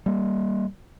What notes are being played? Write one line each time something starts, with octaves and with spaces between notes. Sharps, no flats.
G3 A#3